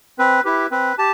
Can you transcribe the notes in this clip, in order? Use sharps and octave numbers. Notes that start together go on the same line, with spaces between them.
C4 B4
E4 G4 B4
C4 B4
G4 A5